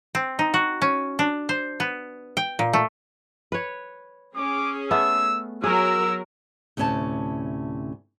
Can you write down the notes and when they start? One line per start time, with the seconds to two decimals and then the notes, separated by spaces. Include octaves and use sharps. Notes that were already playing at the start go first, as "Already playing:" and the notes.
0.15 C4
0.39 D#4
0.54 F#4
0.82 C#4
1.19 D4
1.49 C5
1.80 B3
2.37 G5
2.59 A#2
2.73 A3
3.52 B4 C#5
4.36 C#4 G#4 D6
4.91 A3 B3 E6
5.64 F#3 G#4 A#4 E6
6.77 D2 A2 C3 C#4 C#5 A5